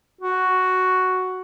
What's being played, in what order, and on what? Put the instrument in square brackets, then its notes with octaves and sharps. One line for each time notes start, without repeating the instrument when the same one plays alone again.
[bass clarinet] F#4